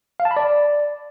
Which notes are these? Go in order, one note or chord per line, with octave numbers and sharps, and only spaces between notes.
F5
A5
B5
D5